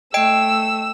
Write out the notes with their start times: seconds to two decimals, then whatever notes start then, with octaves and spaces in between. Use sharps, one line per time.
0.14 A3 D#5 G5 E6 D7